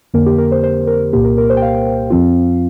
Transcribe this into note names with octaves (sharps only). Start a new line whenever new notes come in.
F2 D3 A#3 A#4
G4
A#4
C5
C5
A#4
C2 A#2 A#3 G4
A#4
A#4
C5
G5
F5
F2 F3 C4 F4